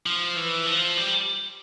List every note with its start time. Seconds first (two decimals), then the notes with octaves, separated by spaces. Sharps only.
0.06 F3
0.36 E3
0.66 F3
0.97 G3